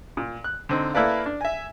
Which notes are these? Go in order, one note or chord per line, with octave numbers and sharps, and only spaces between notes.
A#2
F#6
D3 C4 D#4
A#3 E4 A4 B4 D5 F5
D4
E5 G#5